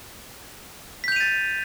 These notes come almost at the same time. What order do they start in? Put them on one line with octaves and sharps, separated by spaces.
B6 G6 F7 D#7 A6